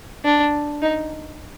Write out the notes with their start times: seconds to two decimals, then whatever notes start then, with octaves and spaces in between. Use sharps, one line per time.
0.25 D4
0.82 D#4